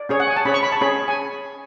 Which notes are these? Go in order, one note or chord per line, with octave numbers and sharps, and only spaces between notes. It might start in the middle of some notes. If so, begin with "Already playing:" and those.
Already playing: D5
C#4 G#4 C#5
F#5
G#5
A5
C#4 G#4 C#5 B5
C#6
B5
A5
C#4 G#4 C#5 B5
G#5